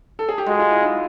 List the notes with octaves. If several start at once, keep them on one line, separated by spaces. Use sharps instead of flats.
A4
G#4
G4
G#3 F#4
F4
E4
D#4